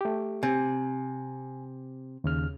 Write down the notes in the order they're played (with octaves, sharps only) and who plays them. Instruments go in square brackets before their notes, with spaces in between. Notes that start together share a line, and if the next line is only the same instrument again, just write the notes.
[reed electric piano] A3 G4
[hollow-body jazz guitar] C3 [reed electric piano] G#5
[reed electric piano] D#2 C#3 F6